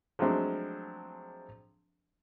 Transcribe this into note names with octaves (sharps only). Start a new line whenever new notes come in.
F3 F#3 G#3 A3 C4 D4